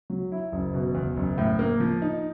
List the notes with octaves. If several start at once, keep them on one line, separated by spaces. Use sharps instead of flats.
F#3
E4
F#1
B2
E2
F#1
A2
A#3
F3
D#4